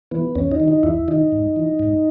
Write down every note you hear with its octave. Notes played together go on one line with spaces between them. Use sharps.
E3 B3
E2 C#4
D#4
D#3
D#4
E2 E4
D#3 D#4
G#2
E3
G#2